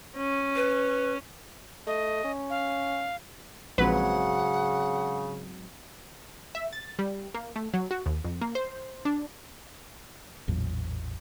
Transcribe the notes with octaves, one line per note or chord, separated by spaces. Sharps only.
C#4
B4
A3 D#5
C#4
F5
A#1 G#2 C#3 F#3 C4 B4 F#5
E5
A6
G3
A#3
A3
F#3
F#4
D#2
F2
A#3
C5
D4
A1 E2 A#2 F#3